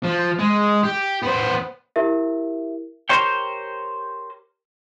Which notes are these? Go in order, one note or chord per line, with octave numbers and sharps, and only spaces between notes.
F3
G#3
G4
B3 C5
E4 G4 A#4 E5
G4 A#4 C5 C#5 G5